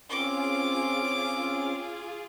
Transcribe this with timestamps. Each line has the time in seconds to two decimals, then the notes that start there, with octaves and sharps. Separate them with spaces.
0.10 C4 C#4 F4 G#4 D6